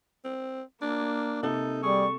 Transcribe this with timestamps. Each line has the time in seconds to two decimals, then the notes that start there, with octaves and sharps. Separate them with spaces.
0.24 C4
0.82 A#3 D4
1.43 C3 D#4 A4
1.83 G3 G#4 C#6